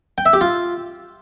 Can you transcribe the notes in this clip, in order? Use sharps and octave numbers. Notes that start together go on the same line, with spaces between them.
G5
E5
G4
F4